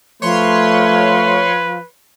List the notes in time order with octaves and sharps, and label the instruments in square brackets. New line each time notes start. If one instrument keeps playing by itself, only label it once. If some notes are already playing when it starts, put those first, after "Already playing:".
[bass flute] F3 [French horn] A3 [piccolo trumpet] B4 [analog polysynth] C#5 C6